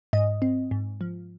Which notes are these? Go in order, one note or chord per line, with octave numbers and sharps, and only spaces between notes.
G#2 D#5
C4
G#2
F3